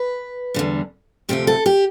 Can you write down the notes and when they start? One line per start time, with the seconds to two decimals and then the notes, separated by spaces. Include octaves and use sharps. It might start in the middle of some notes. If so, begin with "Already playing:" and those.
Already playing: B4
0.54 E2 D3 G3
1.29 D2 C3 F3 A3 G4
1.47 A4
1.66 G4